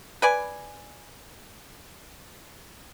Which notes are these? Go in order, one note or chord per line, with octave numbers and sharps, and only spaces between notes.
B4 D5 G#5